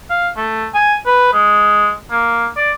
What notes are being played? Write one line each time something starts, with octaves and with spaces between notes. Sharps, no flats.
F5
A3
G#5
B4
G#3
A#3
D5